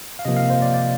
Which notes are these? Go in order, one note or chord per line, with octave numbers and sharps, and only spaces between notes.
F5
C3 F3 A#3 D#5
F5
C5
D5
D5